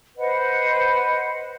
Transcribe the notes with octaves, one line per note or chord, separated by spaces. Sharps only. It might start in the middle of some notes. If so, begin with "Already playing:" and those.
B4 C5 D#5 F#5